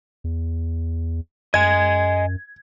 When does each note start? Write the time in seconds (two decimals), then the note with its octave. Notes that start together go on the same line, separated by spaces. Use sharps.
0.24 E2
1.54 F#2 D#5 G#5 G#6